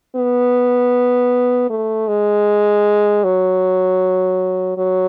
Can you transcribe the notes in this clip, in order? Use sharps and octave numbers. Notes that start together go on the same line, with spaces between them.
B3
A3
G#3
F#3
F#3